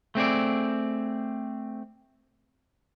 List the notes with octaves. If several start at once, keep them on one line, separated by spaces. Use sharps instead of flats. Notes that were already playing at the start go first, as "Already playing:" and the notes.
A3 C4 G#4 D5